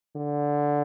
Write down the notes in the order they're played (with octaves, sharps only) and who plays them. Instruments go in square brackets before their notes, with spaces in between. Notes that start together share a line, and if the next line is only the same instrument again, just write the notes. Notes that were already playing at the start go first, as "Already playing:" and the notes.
[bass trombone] D3